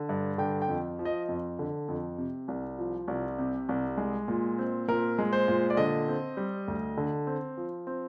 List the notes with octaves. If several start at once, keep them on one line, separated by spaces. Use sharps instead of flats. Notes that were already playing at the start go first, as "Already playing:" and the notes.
Already playing: D3
G2
D3 G5
G5
F2
F3
D#5
F2
D3
F2
C3
C2
F3
C2
C3
C2
G#3
A#2
C4
A#2 A#4
G#3
C5
A#2
D5
D3 D#5
C4
G3
D2
D3
C4
F3
C4